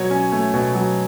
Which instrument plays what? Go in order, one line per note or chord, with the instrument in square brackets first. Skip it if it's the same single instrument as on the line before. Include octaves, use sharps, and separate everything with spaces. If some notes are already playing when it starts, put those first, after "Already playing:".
Already playing: [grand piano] B2 F#3 [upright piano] C#5
[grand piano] C#4
A3
B2
F#3